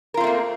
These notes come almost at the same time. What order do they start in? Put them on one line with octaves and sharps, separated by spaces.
A#4 F4 C4 A3 A#3